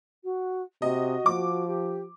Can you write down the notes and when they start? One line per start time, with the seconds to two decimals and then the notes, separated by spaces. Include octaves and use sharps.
0.24 F#4
0.82 C3 F#4 D#5
1.26 F3 D6
1.67 G4